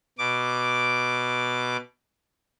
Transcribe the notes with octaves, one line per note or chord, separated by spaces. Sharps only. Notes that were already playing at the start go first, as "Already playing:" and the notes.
B2 D6